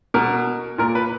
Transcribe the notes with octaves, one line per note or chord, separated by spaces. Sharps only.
B2 A#4
A#2 A#4
B4